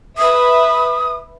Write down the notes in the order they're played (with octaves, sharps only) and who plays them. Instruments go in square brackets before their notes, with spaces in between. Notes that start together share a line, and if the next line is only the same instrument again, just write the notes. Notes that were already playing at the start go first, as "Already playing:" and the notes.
[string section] B4 E5 [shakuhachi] D#6